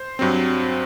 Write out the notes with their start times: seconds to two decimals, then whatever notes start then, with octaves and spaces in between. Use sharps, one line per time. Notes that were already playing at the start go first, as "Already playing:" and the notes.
Already playing: C5
0.19 G2 F#3 C4